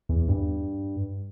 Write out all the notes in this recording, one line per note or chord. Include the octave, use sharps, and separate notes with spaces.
E2
G2